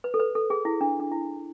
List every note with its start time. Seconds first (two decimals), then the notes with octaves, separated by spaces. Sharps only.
0.04 B4
0.14 A4
0.20 B4
0.35 A4
0.50 G#4
0.65 E4
0.81 D4
1.00 D4
1.11 E4